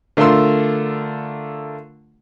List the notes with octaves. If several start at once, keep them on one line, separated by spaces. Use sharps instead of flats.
D3 A3 F4 A#4 C6 E6